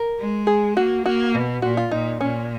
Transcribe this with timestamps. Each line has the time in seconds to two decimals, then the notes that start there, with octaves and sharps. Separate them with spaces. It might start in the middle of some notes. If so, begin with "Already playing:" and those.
Already playing: A#4
0.19 G#3
0.47 G#4
0.76 A#3 F#4
1.05 A#3 F#4
1.34 B2
1.62 A#2 F#4
1.77 F4
1.91 A#2 D#4
2.21 A#2 C#4